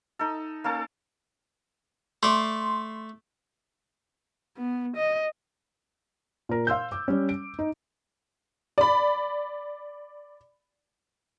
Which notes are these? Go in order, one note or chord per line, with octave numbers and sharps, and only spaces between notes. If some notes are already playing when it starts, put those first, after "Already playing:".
D#4 A4
A#3 C#4 A4 A5
A3 D5 C6
B3
D#5
A#2 A#4
F5 C6 E6 G6
D6
G3 C#4
D7
D#4
D5 B5